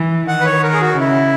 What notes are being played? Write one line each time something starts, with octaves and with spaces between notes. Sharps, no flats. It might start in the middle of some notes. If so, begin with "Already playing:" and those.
Already playing: E3
D#3 F#5
B4
C#5
A#4
G#4
F#4
C#3 E4